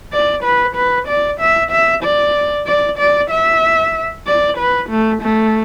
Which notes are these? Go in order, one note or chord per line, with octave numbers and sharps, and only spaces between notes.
D5
B4
B4
D5
E5
E5
D5
D5
D5
E5
D5
B4
A3
A3